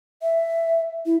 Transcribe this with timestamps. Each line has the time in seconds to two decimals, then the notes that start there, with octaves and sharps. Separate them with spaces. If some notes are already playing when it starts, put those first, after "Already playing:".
0.22 E5
1.06 E4